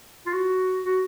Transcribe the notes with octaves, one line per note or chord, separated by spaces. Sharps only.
F4
F#4
F#4